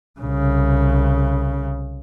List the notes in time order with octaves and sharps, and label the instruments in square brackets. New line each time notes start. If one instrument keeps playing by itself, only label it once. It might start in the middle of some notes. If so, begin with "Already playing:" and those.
[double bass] C2 C#3